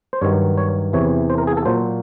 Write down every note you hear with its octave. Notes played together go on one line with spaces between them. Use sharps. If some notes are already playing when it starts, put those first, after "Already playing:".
C5
G2 D#3 F#3 C#5
C#5
E2 C3 E3 C#5
C5
A#4
G#4
A4
A#2 F#3 C5